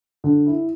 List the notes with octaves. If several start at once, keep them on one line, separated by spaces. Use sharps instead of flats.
D3
E4